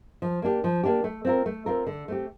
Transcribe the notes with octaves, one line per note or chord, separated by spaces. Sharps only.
F3
A#3 D4 G4
F3
A#3 D4 G4
A3
C4 F4 A#4
A3
C4 F4 A#4
D3
A3 C4 G4